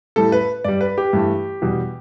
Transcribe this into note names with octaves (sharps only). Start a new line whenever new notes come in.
A2 G3 A4
B4
G2 G3 D5
B4
G4
G2 E3 A3
E2 B2 G3